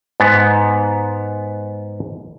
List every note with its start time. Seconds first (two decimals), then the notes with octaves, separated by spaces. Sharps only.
0.20 G#2 B3